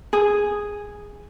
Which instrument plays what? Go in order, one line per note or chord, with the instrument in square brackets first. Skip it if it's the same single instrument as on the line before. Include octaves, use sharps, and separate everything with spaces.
[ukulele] G#4